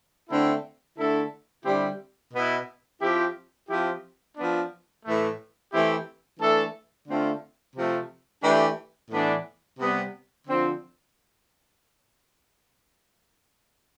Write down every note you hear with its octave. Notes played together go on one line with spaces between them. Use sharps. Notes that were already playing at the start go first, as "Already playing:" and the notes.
D3 A3 C4 E4 A4
D3 A3 E4 A4
D3 G3 C4 E4 G4
B2 B3 E4
F3 C4 E4 G4
F3 C4 E4 G4
F3 B3 D4
A2 E3 A3
E3 A3 C4 E4 G4
E3 A3 D4 A4
D3 A3 C4 F4
C3 F3 A3
E3 A3 D4 G4
A2 E3 B3 D4
C3 G3 B3
D3 F3 C4